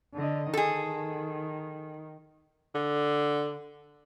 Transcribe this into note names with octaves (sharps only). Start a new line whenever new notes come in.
D3 D#5
D#3 G#4 A4
D3